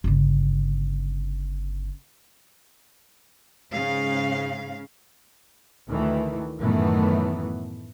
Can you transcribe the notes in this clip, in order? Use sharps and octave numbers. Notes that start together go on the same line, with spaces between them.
G1 C#3
G#2 C#3 F5
D2 D#3 E3 A3
F#2 A2 D#3 E3 A3 B3